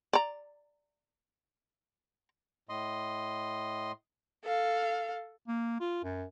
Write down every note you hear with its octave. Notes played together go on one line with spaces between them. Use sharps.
D5 A#5
A2 D#5 C6
A4 F5
A#3
F4
F#2